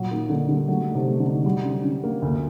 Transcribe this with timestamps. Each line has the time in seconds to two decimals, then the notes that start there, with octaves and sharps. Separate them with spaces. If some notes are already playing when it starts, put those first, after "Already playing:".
Already playing: A#2 F#3
0.11 D#3 A#3
0.29 D3 D#4
0.49 D3 G3
0.68 F#3 A3
0.87 D#4
0.94 C3
1.07 A3
1.20 D3
1.26 D#4
1.45 F#3 G3
1.64 D3
1.84 D3
2.03 A#3
2.22 D2